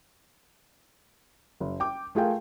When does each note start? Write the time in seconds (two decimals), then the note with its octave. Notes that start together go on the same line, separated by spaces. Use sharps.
1.60 F#1
1.80 G5 D6
2.15 A3 F4 G#4 A#4 F5 G5